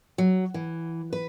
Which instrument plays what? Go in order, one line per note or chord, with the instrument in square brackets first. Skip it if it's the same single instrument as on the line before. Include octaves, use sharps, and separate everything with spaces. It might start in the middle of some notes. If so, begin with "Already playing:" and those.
[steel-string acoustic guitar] F#3
E3
B4